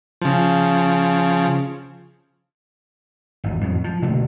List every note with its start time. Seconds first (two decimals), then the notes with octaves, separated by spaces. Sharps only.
0.22 C#3 F3
3.44 G#1 E2
3.61 F2 A2 F#3
3.84 F3
4.02 B2 D3 A3 A#3